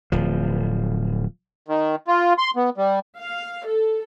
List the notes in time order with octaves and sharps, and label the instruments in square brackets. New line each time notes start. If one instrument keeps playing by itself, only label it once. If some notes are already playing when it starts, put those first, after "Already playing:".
[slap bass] D1 F3
[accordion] D#3
F4
C6
B3
G3
[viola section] F5
A4